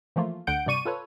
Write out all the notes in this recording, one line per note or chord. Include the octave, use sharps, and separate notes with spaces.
E3 F3 A3 A#3 F4
D2 D3 F#5 G6 D7
G2 C3 D5 C#6 D#7
F4 A4 B4 C#5